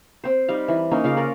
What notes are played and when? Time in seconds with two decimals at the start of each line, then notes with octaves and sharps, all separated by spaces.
0.24 C4 C5
0.48 G3 D#4 F5
0.68 E3
0.91 A#3 C#4 D#4
1.04 C#3 F4 F5 D6
1.17 C#4 A#4 C#5 D5